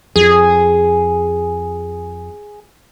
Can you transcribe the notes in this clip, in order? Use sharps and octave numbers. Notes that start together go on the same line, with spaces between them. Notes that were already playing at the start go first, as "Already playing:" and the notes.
F2 G#4